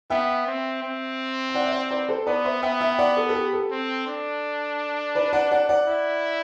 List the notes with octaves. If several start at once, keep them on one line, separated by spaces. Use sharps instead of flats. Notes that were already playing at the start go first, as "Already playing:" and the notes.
B3 E5 G5
C4
C4
G5
D5 F#5
E5
D5 F#5
B4 D5
A4 C5
B3 B4 D5
C5 E5
B3 E5 G5
E5 G5
D5 F#5
A4
A4
G4
A4
C4
D4
B4 D5
D5 F#5
D5 F#5
D5 F#5
E4